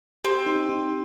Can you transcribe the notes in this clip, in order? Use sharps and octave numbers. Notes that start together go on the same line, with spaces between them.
C4 G4
D#4
D#4